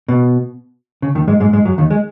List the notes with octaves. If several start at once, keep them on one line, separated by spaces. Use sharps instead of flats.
B2
C#3
D#2 D#3
G#2 G#3
G#2 G#3
G#2 G#3
F#2 F#3
D#2 D#3
G#3